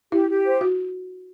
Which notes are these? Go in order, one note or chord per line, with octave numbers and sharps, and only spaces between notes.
E4 G4
G4
C5
F#4